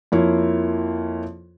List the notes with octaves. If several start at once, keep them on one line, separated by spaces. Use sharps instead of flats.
F2 A#3 E4 F4 C#5